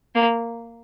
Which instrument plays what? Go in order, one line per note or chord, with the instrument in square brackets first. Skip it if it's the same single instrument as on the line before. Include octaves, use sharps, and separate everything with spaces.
[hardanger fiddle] A#3